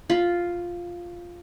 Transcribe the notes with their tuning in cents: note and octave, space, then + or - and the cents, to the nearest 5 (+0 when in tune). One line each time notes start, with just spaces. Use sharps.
F4 +0 B5 +0